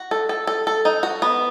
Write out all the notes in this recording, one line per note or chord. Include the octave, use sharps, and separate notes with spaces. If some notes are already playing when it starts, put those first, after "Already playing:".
Already playing: F#4
A4
A4
A4
A4
D#4
F#4
B3